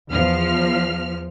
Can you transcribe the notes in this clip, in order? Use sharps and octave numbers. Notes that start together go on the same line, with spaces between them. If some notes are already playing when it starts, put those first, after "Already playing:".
E2 F3 F6